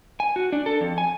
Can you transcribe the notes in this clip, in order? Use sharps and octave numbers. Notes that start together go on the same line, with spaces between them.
G#5
F#4
D4
A4
F2
G#5